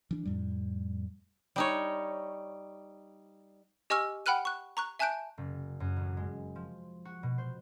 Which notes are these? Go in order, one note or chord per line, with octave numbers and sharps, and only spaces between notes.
E3 D4
F2 A2 G3
G3 D#4 C#5
G4 D#5 G#5 C#6 E6 F6
F#5 G5 B5 F6 F#6 D#7
C#6 F#6
A#5 C#6 F#6
E5 G#5 A5 F#6 G6 D7
F#1
F#2
A1
G#3
F3
F#4
B2
C5